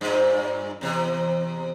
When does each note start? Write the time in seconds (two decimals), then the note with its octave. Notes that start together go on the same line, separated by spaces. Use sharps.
0.01 G2 A#2
0.81 E2 C3